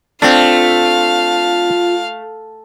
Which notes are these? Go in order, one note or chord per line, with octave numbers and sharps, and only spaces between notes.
A3 C4 D4 F4 F5